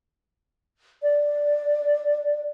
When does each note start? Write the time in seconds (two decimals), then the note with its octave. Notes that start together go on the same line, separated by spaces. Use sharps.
1.02 D5